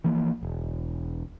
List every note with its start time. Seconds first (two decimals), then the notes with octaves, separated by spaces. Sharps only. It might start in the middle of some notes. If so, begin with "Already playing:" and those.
0.04 E3 F3 A#3
0.43 E1